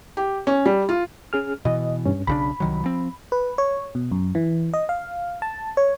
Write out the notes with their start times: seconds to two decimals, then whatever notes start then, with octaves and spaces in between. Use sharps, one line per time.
0.17 G4
0.47 C#4
0.66 G3
0.89 F4
1.33 C#4 G#4 F6
1.65 B2 E3 D#5
2.06 G2 C#4
2.27 B1 C#3 D4 B5
2.60 C2 D#3 F#3
2.84 F3 C4
3.32 B4
3.58 C#5
3.95 B2
4.11 F#2
4.35 E3
4.74 D#5
4.89 F5
5.42 A5
5.77 C#5